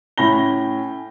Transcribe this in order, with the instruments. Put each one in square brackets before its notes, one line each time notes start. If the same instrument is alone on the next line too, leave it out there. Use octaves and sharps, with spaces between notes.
[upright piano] A2 C#4 B5 A#6 G7